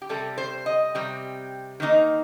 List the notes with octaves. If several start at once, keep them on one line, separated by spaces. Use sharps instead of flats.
G4
C3 G3 C4 A4
C5
D#5
C3 G3 C4
D#3 A#3 D#4